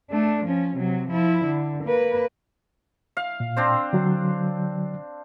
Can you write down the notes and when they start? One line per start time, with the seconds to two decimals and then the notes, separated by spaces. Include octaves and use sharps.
0.10 A3 D4
0.46 F3 C#4
0.77 C3 F#3
1.09 F3 E4
1.45 D3
1.84 A#3 B4
3.17 F5
3.40 A#2
3.56 C4 D4 C5
3.93 D3 F#3